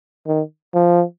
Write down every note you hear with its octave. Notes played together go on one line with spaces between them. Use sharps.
D#3
F3